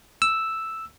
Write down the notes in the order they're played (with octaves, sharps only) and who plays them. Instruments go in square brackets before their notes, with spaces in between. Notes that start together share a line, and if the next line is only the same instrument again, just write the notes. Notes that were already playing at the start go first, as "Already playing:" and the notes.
[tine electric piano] E6